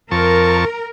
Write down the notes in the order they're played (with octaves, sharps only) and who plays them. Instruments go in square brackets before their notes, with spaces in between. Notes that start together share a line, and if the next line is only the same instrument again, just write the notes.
[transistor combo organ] F2 A5 C#6 [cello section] A#4